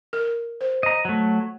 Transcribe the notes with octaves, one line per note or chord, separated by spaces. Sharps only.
A#4
C5
D#5 A#5
F#3 A3